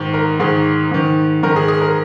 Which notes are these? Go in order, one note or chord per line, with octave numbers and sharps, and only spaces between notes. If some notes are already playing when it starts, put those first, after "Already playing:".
Already playing: G#2 D#3
A#4
G#2 D#3 G#4
G#2 D#3
G#2 D#3 A#4
G#4
G#4
A#4